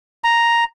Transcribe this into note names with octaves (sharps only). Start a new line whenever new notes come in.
A#5